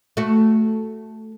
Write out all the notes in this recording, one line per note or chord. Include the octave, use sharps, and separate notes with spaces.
A3 F#4